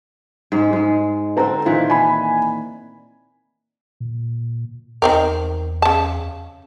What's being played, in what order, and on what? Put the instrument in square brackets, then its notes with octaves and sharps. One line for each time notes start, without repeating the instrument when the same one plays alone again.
[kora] G#2 G#3
G#2 G#3
[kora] D3 C4 [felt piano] C5 A#5
[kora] A#2 D#3 E3 [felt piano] F4
[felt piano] G#5 B5
[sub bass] A#2
[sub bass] E2 [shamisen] D#3 C4 A#4
[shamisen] C#3 A5